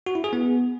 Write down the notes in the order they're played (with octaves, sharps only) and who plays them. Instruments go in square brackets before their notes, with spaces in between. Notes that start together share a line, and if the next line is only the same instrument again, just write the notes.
[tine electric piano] F#4
E4
G#4
B3